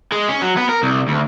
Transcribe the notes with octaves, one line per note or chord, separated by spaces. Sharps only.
G#3
C#4
F#3
B3
A#4
C2
D2